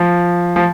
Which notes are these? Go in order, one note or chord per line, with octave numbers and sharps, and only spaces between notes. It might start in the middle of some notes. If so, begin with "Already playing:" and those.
Already playing: F3
F3